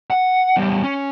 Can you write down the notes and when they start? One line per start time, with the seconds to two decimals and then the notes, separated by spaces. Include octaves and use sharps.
0.10 F#5
0.56 E2 G3
0.83 C#4